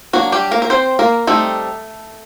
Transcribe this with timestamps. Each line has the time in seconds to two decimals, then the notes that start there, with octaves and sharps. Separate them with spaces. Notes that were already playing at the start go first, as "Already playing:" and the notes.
0.13 F#3 A#3 D4 F#4
0.32 G3 G4
0.51 A#3 A#4
0.62 A#4
0.70 C4 C5
0.99 A#3 A#4
1.27 G3 A3 C4 D#4 A4